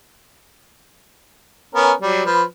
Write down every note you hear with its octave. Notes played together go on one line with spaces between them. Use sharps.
B3 C#4 A#4
F#3 G3
F3 B4